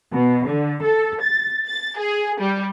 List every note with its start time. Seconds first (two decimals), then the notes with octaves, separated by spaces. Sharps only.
0.12 B2
0.46 D3
0.83 A4
1.22 A6
1.67 A6
1.98 G#4
2.41 G3